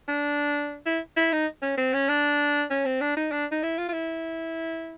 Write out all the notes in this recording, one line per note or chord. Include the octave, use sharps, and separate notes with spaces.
D4
E4
E4
D#4
C#4
C4
C#4
D4
C#4
C4
D4
D#4
D4
D#4
E4
F4
F4
E4